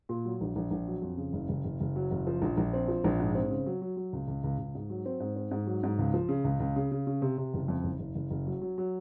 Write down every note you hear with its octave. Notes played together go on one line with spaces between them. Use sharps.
A#2
F#3
A#1
A#1
A#1
F#3
F2
C#3
F#1
F#1
F#1
F#1
F#3
F#1
F3
A#1
A#1
C4
F3
A#1
G#2
C4
C#3
F#3
F#3
F#3
C#2
C#2
C#2
C#2
G#2
F#3
C4
G#2
C4
G#2
F#3
G#2
C#2
F3
C#3
C#2
C#2
C#3
C#3
C#3
C3
C3
F#1
F2
F#1
F#1
F#1
F#1
F#3
F#3
F#3